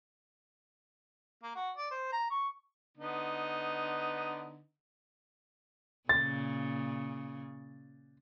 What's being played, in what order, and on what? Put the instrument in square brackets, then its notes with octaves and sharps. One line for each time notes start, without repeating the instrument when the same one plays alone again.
[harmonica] A#3
F#4
D5
C5
A#5
C#6
D3 B3 D#4
[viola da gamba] A#2 C#3 [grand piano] A6